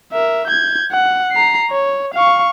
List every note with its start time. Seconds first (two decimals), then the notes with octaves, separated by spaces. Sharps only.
0.13 A#4 E5
0.47 G6 G#6
0.92 F#5
1.32 A#5 C7
1.71 C#5
2.14 F5 C#6